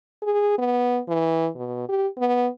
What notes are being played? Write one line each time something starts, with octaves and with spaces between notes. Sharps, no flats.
G#4
B3
E3
B2
G4
B3